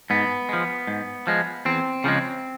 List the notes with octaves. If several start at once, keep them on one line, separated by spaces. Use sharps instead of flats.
G#2 B3
F3 G#3
G#2
F3 G#3
E2 C4
C#3 F3 G#3